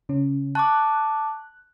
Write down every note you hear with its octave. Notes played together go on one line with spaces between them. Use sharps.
C#3 C#4
A5 C#6 D6 F#6